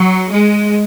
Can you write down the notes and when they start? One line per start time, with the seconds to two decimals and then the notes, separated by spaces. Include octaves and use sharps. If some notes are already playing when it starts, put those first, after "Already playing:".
Already playing: F#3
0.30 G#3